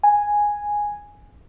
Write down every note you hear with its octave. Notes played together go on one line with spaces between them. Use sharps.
G#5